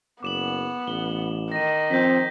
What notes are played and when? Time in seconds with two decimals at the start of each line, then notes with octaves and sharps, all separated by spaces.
0.23 F#1 B3 D6 E7 F#7
0.87 A1 G7
1.52 D#3 A#6 D#7
1.91 F3 C4 G6 A#6 B6